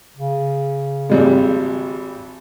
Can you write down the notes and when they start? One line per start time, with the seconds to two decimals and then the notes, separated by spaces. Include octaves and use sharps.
0.17 C#3
1.10 G#1 G3 G#3